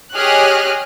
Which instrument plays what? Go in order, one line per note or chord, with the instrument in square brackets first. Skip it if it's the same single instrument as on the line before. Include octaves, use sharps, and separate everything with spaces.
[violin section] G4 G#4 C#5 D#5 F6 F#6